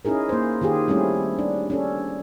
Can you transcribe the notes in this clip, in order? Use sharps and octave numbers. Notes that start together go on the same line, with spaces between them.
C#4 D#4 E4 G#4 A#4
A#3 C5
D#3 F4 G4 G#4
G3 A3 C4 C#4 E4
D4
C#4 D4 A4